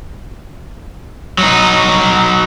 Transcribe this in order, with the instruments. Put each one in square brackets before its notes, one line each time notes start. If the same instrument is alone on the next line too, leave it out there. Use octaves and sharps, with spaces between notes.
[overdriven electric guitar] F#3 D#4